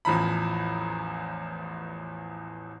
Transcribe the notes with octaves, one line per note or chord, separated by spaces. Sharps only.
A1 E2 F3 A#5 B5